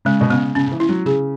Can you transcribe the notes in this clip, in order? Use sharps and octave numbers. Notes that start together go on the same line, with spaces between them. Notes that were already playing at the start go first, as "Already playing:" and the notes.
C#3 G#3
B2
C#3 B3
C#3 C#4
C#3
E3
E4
F#3
C#3 G#4